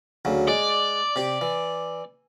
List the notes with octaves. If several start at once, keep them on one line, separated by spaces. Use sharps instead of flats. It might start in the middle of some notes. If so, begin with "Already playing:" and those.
D2 C#3 F#3
G#3 D5
C3 G4
E3